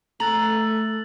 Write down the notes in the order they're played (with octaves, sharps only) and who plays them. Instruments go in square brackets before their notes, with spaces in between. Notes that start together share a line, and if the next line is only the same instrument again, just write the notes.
[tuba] A3 [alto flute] A4 [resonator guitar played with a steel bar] A#5 [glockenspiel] F#6 A6 F#7